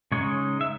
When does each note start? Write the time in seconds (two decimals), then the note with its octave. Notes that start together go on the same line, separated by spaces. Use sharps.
0.12 C#3 G#3 D#4 C#5
0.61 E5